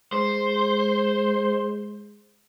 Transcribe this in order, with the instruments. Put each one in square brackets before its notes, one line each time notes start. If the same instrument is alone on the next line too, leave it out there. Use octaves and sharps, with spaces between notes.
[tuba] G#3 [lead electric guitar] C5